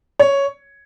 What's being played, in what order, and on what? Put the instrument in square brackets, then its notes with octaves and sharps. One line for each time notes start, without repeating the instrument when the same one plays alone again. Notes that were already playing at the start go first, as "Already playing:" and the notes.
[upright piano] C#5